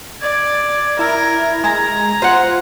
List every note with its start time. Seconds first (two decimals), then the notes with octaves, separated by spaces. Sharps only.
0.21 D5 G#6
0.99 E4 A#4
1.64 G#3 A#5
2.22 F4 C5 F#5